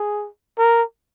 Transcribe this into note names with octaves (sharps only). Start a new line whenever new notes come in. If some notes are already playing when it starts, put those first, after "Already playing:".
Already playing: G#4
A#4